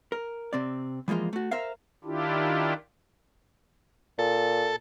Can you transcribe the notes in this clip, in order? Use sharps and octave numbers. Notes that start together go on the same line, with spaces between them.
A#4
C3 C4 D5
E3 F3 G#3 A#3 F4
A3 F#4
A#4 C5 E5 F5
D#3 D4 E4 F4 G4
A#2 A4